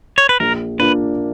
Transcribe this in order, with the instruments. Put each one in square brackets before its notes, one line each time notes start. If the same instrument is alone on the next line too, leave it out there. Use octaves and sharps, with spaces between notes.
[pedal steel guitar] C#5
B4
[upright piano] A#1 [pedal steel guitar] A#4
[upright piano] A#2 A#3 D4 [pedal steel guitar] B4